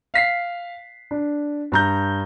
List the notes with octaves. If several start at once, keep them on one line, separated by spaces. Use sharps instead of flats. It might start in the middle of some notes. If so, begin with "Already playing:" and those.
F5 B6 C7
D4
G2 A#5 G6